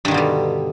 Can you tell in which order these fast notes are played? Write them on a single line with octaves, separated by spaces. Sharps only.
G2 D#3 D3 B2 G3